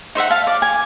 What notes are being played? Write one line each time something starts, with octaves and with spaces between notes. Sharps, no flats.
D#4 C5 E5 F#5
F5 A5
D5
G#5